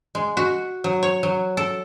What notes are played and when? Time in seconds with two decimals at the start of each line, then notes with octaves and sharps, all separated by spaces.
0.15 G#3
0.37 F#4
0.84 F#3
1.03 C#5
1.23 F#3
1.57 A4